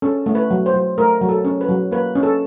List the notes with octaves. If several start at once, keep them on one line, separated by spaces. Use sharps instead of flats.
C#4 A4
A3
B4
F#3
C5
F#3
A3 A#4
F#3
A4
C#4
B4
F#3
A#3 B4
C#4
A4